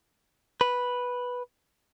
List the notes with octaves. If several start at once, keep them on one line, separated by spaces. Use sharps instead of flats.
B4